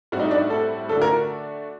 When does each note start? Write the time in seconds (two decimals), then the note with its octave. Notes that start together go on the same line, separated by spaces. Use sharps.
0.12 A2 G3 C4 F#4
0.20 D#4
0.31 D4
0.50 A4
0.89 D3 A3 D4 F#4 A4
1.02 A#4